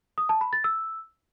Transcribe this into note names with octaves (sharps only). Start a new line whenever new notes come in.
D#6
A5
B5
A6
E6